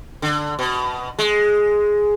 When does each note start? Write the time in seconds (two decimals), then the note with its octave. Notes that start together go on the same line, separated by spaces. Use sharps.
0.22 D3
0.59 B2
1.19 G#3